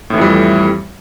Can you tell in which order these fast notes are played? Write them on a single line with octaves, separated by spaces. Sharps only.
A2 E3 F2 G3